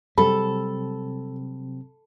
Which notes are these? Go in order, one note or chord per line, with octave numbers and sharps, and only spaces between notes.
C3 F#3 G3 C4 A4 B5